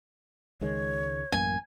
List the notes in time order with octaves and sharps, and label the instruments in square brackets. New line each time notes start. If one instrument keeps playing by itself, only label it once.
[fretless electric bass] C#2 D#3 G#3 [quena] C#5
[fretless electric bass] A1 F#2 A#3 [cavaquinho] G#5